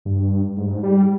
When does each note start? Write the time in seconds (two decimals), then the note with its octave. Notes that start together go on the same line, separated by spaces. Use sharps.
0.05 G2
0.57 G#2
0.65 G2
0.73 G#2
0.83 G3